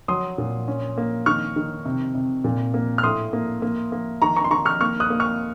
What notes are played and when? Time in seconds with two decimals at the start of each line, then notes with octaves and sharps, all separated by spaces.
0.08 F#3 C6 D#6
0.38 A#2
0.68 C#4
0.98 A#3
1.26 D#3 C#6 F6
1.56 D#3
1.85 C3
2.15 C3
2.44 A#2
2.74 A#3
2.98 F6
3.03 A2 C6 D#6
3.33 A#3
3.62 A#3
3.92 A#3
4.22 D#3 A#5 C#6
4.36 A#5 C#6
4.44 C6
4.51 D#3 A#5 C#6
4.65 C#6 F6
4.81 A#3 C#6 F6
5.00 D#6 F#6
5.10 A#3
5.20 C#6 F6